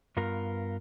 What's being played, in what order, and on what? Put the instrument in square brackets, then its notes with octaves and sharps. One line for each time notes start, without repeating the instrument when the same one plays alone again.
[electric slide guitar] G2 B3 F4 A#4